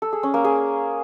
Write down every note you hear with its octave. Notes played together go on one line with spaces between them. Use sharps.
A4
G#4
C#4
A#3
G#4